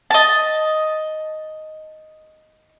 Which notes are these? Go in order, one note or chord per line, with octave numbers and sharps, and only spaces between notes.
D#5 A5